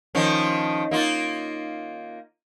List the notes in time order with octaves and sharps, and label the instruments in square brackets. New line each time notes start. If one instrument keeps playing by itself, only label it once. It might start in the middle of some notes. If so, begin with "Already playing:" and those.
[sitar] D#3 F3 C#4
A#3 D#4 F4